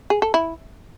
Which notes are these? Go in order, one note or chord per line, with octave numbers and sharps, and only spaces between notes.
G#4
A4
E4